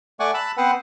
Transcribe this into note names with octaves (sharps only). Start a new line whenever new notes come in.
A3 D5 F#5 G#5 C#6
A5 B5 E6 F#6
B3 C4 B4 C5 F#5